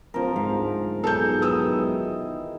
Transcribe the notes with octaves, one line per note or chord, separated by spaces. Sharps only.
D1 F3 A#4
G#2 F5
B1 G#4 A4 G6
D#3 E3 D#6 E6